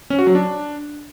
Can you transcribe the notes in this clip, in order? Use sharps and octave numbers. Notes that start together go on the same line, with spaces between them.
C#4
F#4
F#3
D4